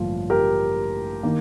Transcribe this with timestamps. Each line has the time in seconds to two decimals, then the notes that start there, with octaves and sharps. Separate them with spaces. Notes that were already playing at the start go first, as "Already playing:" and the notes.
Already playing: A1 G2 D3 F3 A#3 F4
0.30 G4 A#4
1.23 D#3 A#3